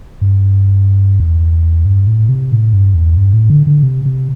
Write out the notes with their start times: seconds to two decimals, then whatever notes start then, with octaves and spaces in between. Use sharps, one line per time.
0.21 G2
1.20 E2
1.85 G2
2.07 A2
2.29 C3
2.52 A2
2.73 G2
2.95 E2
3.17 G2
3.33 A2
3.50 D3
3.67 D3
3.83 C3
4.05 C3